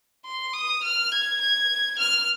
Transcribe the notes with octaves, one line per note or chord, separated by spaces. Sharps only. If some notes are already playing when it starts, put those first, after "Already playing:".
C6
D#6
F6
G#6
G#6
F6